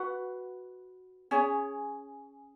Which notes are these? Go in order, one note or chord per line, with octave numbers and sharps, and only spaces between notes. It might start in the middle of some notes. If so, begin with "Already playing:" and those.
Already playing: F#4 B4 F#5
C#4 G#4 C#5